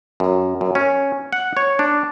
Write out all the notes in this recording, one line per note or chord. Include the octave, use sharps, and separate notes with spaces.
F#2
F#2
C#4
F#5
C#5
D4